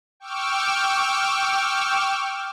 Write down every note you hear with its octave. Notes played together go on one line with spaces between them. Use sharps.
G5 C#6 D6 E6 F6